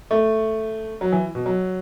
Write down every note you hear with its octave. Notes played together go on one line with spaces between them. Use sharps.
A3
F#3
E3
B2
F#3